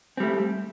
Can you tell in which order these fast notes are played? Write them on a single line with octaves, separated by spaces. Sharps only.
C4 G3 A3